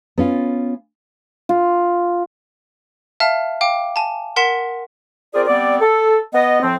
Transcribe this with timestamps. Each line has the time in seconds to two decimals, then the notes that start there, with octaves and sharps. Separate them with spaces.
0.18 B3 C#4 F4
1.49 F4
3.20 E5 F5 A5 F6
3.61 F5 G5 D6
3.96 G#5 A5
4.36 A#4 F#5 C6 B6 E7
5.33 C4 F4 G#4 A#4 D5
5.47 G3 B3 C4 D5
5.80 A4
6.33 B3 D#5
6.62 A2 F3 C4